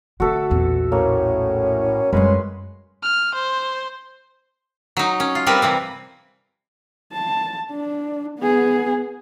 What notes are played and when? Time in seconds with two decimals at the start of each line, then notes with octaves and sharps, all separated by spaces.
0.20 D3 A3 F#4 A4 E5
0.50 A#1 E2
0.92 A2 A#3 C#4
2.13 F#2 G3 G#3 C#4 B4 C6
3.03 F6
3.34 C5
4.97 F#3 D#4
5.20 C#4
5.35 F4
5.47 G3 C4 A#4 B4
5.62 C3 E3 C4
7.13 A5
7.71 D4
8.39 B3 G#4